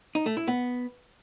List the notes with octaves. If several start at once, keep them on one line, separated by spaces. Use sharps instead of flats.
D#4
A3
E4
B3